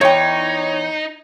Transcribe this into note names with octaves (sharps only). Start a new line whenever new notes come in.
E2 D#4 C#5 G5